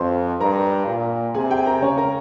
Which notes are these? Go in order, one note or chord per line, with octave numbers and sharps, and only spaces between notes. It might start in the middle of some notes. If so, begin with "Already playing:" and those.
Already playing: F2 C5 C6
G2 A#4 A#5
A#2
C3 G#4 G#5
G4 G5
A#4 A#5
C#3 C#4 C#5
A#4 A#5